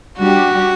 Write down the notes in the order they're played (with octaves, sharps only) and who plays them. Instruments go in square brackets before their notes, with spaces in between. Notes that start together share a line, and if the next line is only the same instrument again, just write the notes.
[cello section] G3 D4 G4 [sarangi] F#4